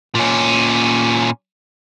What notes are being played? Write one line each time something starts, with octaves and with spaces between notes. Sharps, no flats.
A#2 C#4